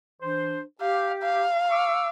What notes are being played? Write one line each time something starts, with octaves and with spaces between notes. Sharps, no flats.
E3 D4 C5
G4 F5
F5
C#6 D6 E6